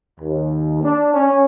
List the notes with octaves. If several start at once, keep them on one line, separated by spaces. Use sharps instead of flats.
D#2
D4
C#4